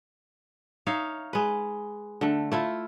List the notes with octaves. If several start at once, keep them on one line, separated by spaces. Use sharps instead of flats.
D#4 C#5 E5 F5
G#3 B4
D3 A3
A3 E4 F4